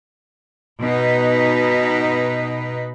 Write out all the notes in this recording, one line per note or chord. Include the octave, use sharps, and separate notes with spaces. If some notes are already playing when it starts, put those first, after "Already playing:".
B2 D#4 B4